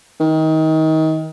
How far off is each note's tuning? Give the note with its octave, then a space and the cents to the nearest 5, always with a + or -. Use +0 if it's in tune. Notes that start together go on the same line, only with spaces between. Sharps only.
D#3 +25